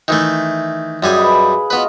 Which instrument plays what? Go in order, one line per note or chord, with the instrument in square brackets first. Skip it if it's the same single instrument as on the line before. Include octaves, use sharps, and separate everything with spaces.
[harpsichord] D#3 E3 A3
[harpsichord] F#2 G3 G#5 [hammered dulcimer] F4 G#4 D#5
[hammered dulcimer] B4 B5
[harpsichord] B3 B4 [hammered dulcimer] F4 F#4 D#5